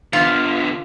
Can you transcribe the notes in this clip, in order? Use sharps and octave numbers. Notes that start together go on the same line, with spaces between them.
D3 B3 F4